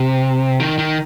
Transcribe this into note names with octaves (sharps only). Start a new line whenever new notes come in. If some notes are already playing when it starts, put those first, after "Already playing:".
Already playing: C3
D#3
D#3